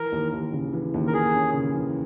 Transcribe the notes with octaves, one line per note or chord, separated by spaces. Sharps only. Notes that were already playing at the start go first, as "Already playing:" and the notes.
Already playing: E3 A#4
D#2
D#2
C#3
E3
D#2
A#4
A#3 G#4
C#4
C#3
E3